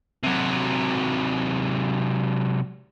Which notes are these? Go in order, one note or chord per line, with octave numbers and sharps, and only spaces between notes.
C3 F#3